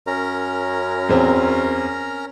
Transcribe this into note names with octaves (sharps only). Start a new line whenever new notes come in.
F#2 C#4 A#4 A#5
E2 C4